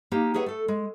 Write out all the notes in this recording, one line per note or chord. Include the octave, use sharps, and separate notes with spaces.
A#3 D#4 G4
G4 G#4 B4 C#5 E5 F#5
A3 A4
G#3